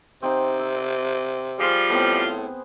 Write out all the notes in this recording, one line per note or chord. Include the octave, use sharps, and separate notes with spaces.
C3 C4 D#4 F#5
E6
F3 G3 F4 G#4 C5
A2 B3 C4